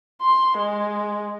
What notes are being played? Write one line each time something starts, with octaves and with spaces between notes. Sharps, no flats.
C6
G#3